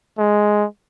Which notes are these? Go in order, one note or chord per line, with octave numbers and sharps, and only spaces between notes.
G#3